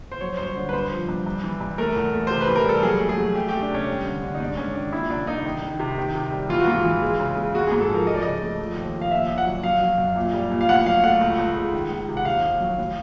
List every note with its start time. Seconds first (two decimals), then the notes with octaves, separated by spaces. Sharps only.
0.12 C5
0.21 F#3 C#5
0.37 G2 C5
0.47 C#5
0.56 D3
0.69 B4
0.73 G2 C5
0.91 F3
1.09 G2
1.26 G2
1.44 E3
1.61 G2
1.78 A3 A#4
1.96 E2
2.13 A3
2.27 C3 C5
2.41 B4
2.48 E3
2.56 A#4
2.66 G3 A4
2.83 F#3 G#4
3.00 A3
3.09 G#4
3.18 F#3
3.35 A3 G4
3.49 A3 G4
3.62 D4
3.71 C3 C#4
3.88 G2
4.05 D3
4.22 D3
4.34 D#4
4.40 G#2 D4
4.57 G#2 C#4
4.75 D#3 D4
4.92 A#2 E4
5.10 C2 D4
5.27 C2 D#4
5.45 D#3
5.62 D#3
5.79 C3
5.98 D#3
6.15 C3
6.32 G3
6.49 E3 F4
6.60 F#4
6.68 G#2 F4
6.85 E3
7.02 G#3
7.19 C#3
7.37 G#3
7.54 G#3 F#4
7.67 G#2 G#4
7.81 A4
7.90 F3 A#4
8.07 F3 D#5
8.15 D5
8.22 C#3 D#5
8.42 A3
8.59 F3
8.77 D#2
8.94 F3
9.02 F5
9.11 A#2 E5
9.29 A#2
9.38 F#5
9.46 F#3
9.64 F#3 F5
9.81 F#3
9.98 F#2
10.16 A#2
10.34 G3
10.51 A#2
10.61 F5
10.68 A2 F#5
10.86 F#3 F5
11.03 A3 F#5
11.21 C#2
11.38 C#2
11.56 G#3
11.73 D#3
11.91 C#2
12.09 C3
12.17 F#5
12.25 D#2 F5
12.43 D#2
12.61 F#3
12.78 A2